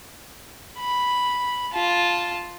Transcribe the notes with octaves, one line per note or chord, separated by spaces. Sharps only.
B5
F4 A5